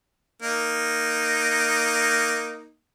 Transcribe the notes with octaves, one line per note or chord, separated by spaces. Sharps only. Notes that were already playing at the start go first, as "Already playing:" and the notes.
A#3 D#4